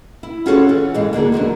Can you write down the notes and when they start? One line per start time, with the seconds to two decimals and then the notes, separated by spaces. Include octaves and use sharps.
0.23 E4
0.46 C#4 F4 F#4 G#4 A4 C#5
0.69 E3
0.94 D#2 G#2 G#3
1.13 D2 D3 A#3 G#4
1.32 E2 F#3 G#3 D4